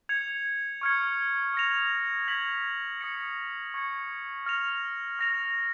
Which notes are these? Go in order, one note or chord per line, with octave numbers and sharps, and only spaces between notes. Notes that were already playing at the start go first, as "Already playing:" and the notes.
G#6 C#7 F7
C#6 F6 G#6 C#7
D#6 A#6 F7
G#6 B6 F#7
D#6 A#6 C#7
C#6 G#6 C#7
F6 A#6 F7
F6 A#6 F7